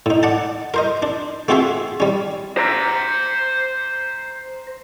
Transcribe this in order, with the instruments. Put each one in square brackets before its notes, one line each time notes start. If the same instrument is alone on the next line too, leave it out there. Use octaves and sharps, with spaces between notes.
[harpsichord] A2 D#4
D5 F#5 A5
A#4 C5 D#5
D4
A3 C4 F4 F#4 G#4 E5
G3 C#4
[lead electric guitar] C5 A#5